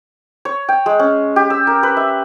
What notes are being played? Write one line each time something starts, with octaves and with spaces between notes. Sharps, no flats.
C#5
G5
G#3
C#4
G4
E6
A#4
B4
E5